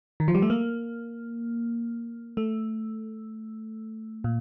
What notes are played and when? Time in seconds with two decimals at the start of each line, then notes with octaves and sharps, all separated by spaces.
0.20 D#3
0.28 F3
0.35 G3
0.42 A3
0.50 A#3
2.37 A3
4.24 A#2